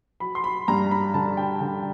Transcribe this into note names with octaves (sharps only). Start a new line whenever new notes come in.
F#3 B5
C6
B5
G2 A#5
B5
D3 A5
G5
D3 G5